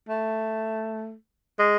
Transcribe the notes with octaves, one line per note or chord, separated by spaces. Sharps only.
A3
G#3